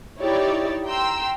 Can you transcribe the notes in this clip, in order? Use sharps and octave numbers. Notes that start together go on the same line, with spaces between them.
D#4 E4 G4 C#5 D5
G5 A#5 C6 E6